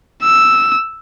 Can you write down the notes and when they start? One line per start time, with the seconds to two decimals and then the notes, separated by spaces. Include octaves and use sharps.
0.23 E6